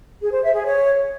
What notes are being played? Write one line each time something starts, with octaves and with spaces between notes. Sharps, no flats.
G#4
C5
E5
G#4
C#5